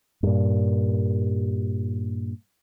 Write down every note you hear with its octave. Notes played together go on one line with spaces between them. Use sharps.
G2 A#2